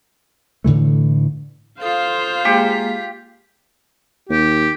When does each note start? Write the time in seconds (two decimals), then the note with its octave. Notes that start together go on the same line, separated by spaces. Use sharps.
0.64 A2 D3 E3 A3
1.81 F4 A4 C5 F5 D#6
2.45 G#3 A#3 G4 G#4
4.29 D#2 G4